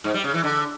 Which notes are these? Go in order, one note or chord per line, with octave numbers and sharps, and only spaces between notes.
G#2
G3
C#3
E3
D3